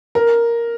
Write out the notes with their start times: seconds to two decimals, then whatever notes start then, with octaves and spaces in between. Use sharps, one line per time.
0.15 A#4